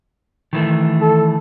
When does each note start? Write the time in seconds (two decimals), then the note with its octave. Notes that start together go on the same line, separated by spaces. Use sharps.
0.53 D#3 E3 A3
1.01 A4